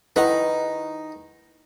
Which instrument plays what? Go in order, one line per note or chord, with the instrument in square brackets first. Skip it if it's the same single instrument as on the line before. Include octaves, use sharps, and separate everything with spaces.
[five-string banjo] D#3 G#4 B4 [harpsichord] D#4 [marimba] E4 F#5 A#5